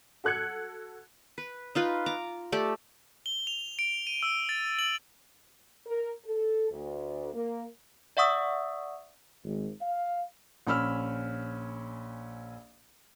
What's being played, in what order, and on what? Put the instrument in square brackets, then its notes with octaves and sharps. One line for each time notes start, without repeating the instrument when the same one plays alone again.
[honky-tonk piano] F#4 A4 F#6 G#6 C#7
[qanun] B4
D#4 F4 B4
A#5 D6
A3 G4 D5
[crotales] G7
F7
D7
D#7
E6
A6
F#7
[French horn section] A#4
A4
D2
A#3
[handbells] D5 E5 F#5 C#6 D#6 E6
[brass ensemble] G#1
F5
[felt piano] A#1 C#4 B5 E6 F6